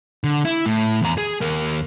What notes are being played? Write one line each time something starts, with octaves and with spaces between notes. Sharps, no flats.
D3
E4
A2
E2 A#5
G#4
D#2 A#4